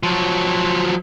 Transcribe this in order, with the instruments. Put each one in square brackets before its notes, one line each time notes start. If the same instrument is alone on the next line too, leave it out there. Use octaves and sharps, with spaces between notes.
[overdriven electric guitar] F3 F#3